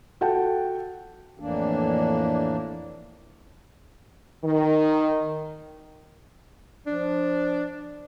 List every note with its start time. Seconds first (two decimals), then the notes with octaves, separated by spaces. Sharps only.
0.21 F#4 A4 F#5 G5 A5
1.39 F2 A2 E3 A#3 D4
4.44 D#3
6.87 F3 D4